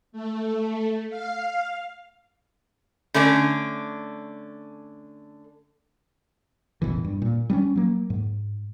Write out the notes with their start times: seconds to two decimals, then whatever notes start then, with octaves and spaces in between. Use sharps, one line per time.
0.12 A3
1.10 F5
3.14 D3 A3 C#4 D4
6.82 E1 A1 B2 E3
7.04 G2
7.22 A#2
7.50 G3 B3 C#4
7.76 F#3 A#3
8.10 G#2